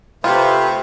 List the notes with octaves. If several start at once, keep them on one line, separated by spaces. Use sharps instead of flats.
C3 A3 F4 B4